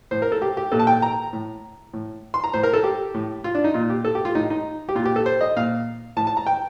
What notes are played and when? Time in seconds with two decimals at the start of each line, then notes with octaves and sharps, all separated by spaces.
0.11 A2 C5
0.22 A#4
0.32 A4
0.42 G4
0.57 G4
0.72 A#2 A4
0.79 A5
0.87 G5
1.02 A#5
1.33 A2
1.93 A2
2.34 C6
2.44 A#5
2.53 A2 C5
2.63 A#4
2.73 A4
2.84 G4
3.14 A2
3.44 F4
3.55 D4
3.64 D#4
3.74 A#2 F4
3.90 G4
4.05 A4
4.15 G4
4.25 F4
4.35 A2 D#4
4.50 D#4
4.89 G4
4.95 A#2 F4
5.05 G4
5.16 A4
5.26 C5
5.41 D#5
5.57 A#2 F5
6.16 A2 A5
6.27 A5
6.37 A#5
6.46 G5